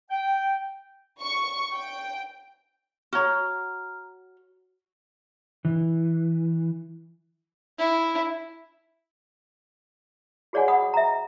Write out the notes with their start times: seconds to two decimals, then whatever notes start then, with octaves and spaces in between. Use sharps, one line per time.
0.11 G5
1.21 C#6
1.74 G5
3.13 F#4 C#5 A#5 F6
5.65 E3
7.78 E4
10.53 F#4 G#4 C#5 D5 F#5 G#5
10.68 F#5 B5 D#6
10.94 E5 A#5